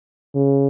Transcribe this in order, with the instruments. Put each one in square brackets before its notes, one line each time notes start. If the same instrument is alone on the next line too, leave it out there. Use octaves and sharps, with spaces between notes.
[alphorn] C#3